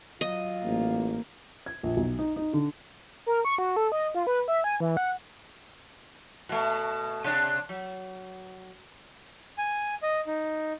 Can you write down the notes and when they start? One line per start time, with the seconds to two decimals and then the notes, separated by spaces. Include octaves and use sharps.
0.21 F#3 F4 D#5
0.64 A1 A#3
1.66 G#6
1.83 A#1
1.97 B1
2.19 D#4
2.36 D#4
2.53 D3
3.26 A#4
3.45 C#6
3.58 F#4
3.76 A4
3.92 D#5
4.15 F4
4.27 B4
4.48 E5
4.64 G#5
4.80 E3
4.97 F#5
6.49 B2 A3
7.24 C3 D4
7.69 F#3
9.58 G#5
10.03 D#5
10.26 D#4